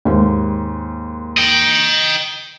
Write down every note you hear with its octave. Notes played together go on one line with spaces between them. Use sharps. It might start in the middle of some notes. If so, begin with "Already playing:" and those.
D#2 G#2
D#5 G5